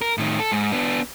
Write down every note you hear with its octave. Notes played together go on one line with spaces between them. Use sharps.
A#4
A2 D#3
A4
G#2
B3 D4